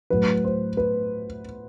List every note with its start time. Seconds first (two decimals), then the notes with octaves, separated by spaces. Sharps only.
0.10 A2 F#3 B4
0.44 C5
0.77 B4